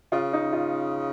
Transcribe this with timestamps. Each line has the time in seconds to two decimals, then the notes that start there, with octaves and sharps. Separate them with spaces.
0.12 C#3 F4
0.33 D#4
0.53 F4